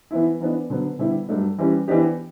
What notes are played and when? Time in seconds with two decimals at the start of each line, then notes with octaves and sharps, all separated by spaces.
0.11 E3 B3 E4
0.41 E3 B3 D4
0.70 D3 F#3 B3
0.99 D3 G3 B3 E4 G4
1.29 G2 F#3 A3 D4
1.58 E3 G3 C#4 G4
1.88 E3 B3 D4 G4